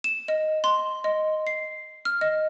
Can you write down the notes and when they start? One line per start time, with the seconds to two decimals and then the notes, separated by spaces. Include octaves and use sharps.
0.04 E7
0.28 D#5
0.64 C6
1.04 D#5
1.47 C7
2.05 F6
2.21 D#5